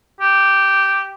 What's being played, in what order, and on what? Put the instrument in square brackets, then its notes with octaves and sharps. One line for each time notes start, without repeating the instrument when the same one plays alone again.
[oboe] G4